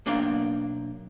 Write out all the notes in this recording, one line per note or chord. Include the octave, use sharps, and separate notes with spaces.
B1 A#3 D4 F5 G5